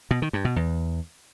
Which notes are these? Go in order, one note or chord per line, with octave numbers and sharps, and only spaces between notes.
B2
D#3
G2
B2
E2